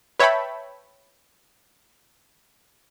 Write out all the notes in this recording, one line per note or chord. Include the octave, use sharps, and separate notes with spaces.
B4 C#5 E5 G5 A5 B5